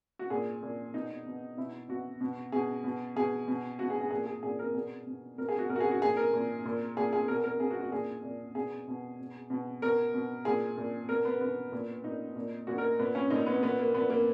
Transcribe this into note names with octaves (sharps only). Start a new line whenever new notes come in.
F#4
A#2 G#4
A#2
B2 D#4
B2
B2 E4
B2 F#4
B2
B2 G#4
B2
B2 G#4
B2
B2 F#4
G#4
G#4
A#2 G#4
G#4
A#2 G#4
A#4
B2 G#4
B2
B2 A#4
G#4
F#4
B2 A#4
F#4
G#4
F#4
A#2 G#4
A#4
A#2
A#2
A#2 G#4
G#4
B2 A#4
A#4
B2 G#4
F#4
F#4
A#2 G#4
A#2
B2 G#4
B2
B2
B2
B2 A#4
B2
A#2 G#4
A#2
B2 A#4
B3
B2 B3
A#2
A#2 D#4
A#2
A#2 F#4
A#4
A#2 B3
C#4
A#2 D#4
B3
A#2 B3
A#3
A#2 B3
A#3